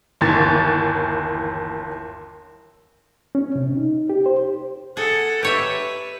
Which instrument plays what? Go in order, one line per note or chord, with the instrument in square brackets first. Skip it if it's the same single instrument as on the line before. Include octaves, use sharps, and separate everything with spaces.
[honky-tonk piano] G1 D#2 E3 A6
[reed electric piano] C#4
C3
D#4
G4
C5
[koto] G#4 [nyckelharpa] A4 F#5
[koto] G4 C#5 E5 [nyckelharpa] B4